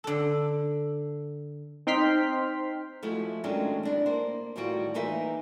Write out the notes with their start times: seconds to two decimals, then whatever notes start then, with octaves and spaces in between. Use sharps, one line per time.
0.04 D3 A4
1.87 C4 D#4 G5 C6 F6 B6
3.03 F3 G#3 A3 E4 F#4
3.44 D#3 F#3 G#3 A3 C#4 D4
3.83 C4 D4 E4
4.06 A#3 C5
4.56 A2 D#3 G3 F4 F#4 G5
4.94 E3 A#3 D#4 B4 C5 E5